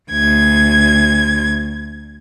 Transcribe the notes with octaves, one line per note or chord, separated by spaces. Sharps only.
D2 G#6